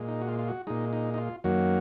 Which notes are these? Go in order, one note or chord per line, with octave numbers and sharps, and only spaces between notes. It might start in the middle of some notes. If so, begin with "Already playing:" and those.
Already playing: A#2 G#3
D#4
F#4
F4
F4
F#4
A#2 G#3 D#4
D#4
D#4
F4
F#2 D#3 F#3 A#3 F#4